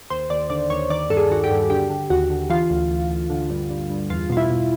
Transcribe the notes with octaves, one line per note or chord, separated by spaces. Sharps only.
D#2 C5
D#2 D5
D3 D5
D#2 C#5
D#3 D5
G2 A4
G#4
D#3 F#4
G4
G2
D3 G4
D3
D#2 F#4
D3
E3 F4
D2
D2
D2
D3
G2
G2
G2
E2 F4
B2 F4
E4
B2